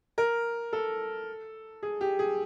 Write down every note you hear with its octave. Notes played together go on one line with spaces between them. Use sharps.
A#4
A4
G#4
G4
G#4